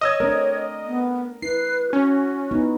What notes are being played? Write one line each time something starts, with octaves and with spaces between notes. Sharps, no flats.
C#5 D#5 D#6 E6 G#6
A3 C4 D4 A#4
B3
E4 B4 C7
C#4 F#4
B3 D#4 E4